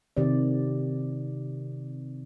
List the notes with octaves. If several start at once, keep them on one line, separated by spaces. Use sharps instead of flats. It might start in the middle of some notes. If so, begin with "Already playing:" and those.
C3 D#3 D5